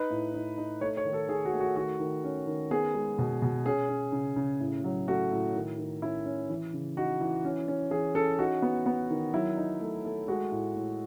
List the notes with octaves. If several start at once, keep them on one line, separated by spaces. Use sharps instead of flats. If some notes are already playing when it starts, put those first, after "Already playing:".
Already playing: D#4 B4
A2
D#4
D#4
A3 C#5
C#5
D#3
A4
D#3 G#4
F#4
A3
F#4
D#3 F#4
D#3
C#4
D#3
B3 G#4
G#3
B2
B2
C#4 G#4
C#4
C#3
C#3
A2
F#3
A3 F#4
A2
D#3
D#3
C#4 E4
C#4
E3
C#3
D#4 F#4
E3
C#4
C#4
E3 G#4
C#4 A4
D#4 F#4
B3
B3
D#3
F#3 E4
D#4
A3
A3
G#3 F#4
A2
A2